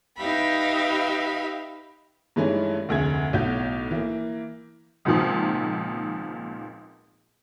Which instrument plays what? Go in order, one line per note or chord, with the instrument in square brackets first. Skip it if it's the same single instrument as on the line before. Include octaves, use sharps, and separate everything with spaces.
[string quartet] D#4 G4 B4 E5 F5 B5
[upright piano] G2 E3 G#3 A3 C#4 D#4
F1 D2 G#4 G#6
B1 A2 F#4 G6
E3 A#3
[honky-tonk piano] G#1 C#2 A#2 D#3 F3